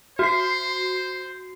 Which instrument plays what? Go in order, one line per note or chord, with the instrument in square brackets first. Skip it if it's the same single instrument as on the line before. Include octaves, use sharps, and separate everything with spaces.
[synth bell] F#4 C7 [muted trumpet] C5